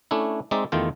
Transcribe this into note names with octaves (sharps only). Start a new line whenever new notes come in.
A3 C#4 D4 E4
G#3 C4 D#4 D5 E5
E2 D#3 A3 F4 G5